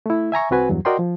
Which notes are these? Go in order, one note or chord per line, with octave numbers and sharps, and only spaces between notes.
A3 E4
E5 G#5 A#5 C#6
C2 C4 F#4 B4 G#5
E2 G2 F#3
F#4 A#4 D5 D#5 G5 C6
F3